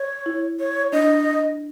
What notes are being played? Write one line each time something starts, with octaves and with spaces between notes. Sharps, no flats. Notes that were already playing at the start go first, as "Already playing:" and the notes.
Already playing: C#5
E4
C#5
D4 D#5